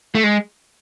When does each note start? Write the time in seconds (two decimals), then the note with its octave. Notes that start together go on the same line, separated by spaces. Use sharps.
0.15 A3
0.24 G#3